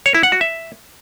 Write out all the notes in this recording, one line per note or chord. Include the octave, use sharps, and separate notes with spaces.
C#5
E4
F#5
F#4
E5